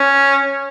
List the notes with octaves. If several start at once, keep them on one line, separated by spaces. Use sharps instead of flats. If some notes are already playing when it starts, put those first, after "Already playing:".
Already playing: C#4